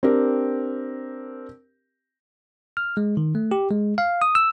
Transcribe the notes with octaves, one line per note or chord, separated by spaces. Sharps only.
C4 D4 G4 A#4
F6
G#3
D#3
A3
G4
G#3
F5
D#6
E6